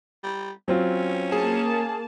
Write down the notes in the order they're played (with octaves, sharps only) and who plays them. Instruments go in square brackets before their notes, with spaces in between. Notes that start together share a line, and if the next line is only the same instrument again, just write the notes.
[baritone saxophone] G3
[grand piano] F#3 C4 F4 [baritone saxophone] C#4
[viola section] A#3 A5 [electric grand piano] G#4